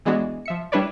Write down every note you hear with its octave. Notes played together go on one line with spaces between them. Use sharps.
E3 G#3 B3 D4 F#4
F3 E5 C#7
G3 D4 E4 B4 C#5 D5